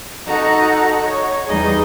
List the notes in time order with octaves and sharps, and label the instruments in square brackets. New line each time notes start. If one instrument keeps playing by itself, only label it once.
[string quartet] D#4 F#4 A4 F#5 A#5
C#5
E2 G3 D#4 G#4 D#5